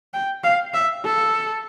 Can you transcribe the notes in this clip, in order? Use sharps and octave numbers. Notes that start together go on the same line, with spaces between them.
G5
F5
E5
A4